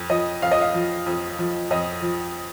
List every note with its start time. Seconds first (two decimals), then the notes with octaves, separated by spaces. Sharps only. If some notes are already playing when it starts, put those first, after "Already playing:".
Already playing: F2
0.10 F3 D#5
0.42 F2 F5
0.52 D#5
0.61 F5
0.74 F3
1.06 F2
1.39 F3
1.71 F2 D#5
2.02 F3